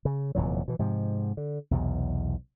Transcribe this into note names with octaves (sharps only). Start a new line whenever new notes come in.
C#3
F1 E2 A#2 F#3
B2 E3
G#2 C3 F3
D3
B1 E2 C3